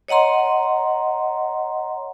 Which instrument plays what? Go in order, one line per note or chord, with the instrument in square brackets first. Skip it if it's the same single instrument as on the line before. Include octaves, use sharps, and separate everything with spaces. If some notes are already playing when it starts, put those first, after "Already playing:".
[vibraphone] C#5 D#5 F#5 A#5 C6